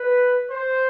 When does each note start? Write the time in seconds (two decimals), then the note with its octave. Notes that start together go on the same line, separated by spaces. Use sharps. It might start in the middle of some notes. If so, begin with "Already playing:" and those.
Already playing: B4
0.50 C5